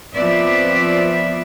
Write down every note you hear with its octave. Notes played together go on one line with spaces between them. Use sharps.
F3 B3 C4 B4 D5 E5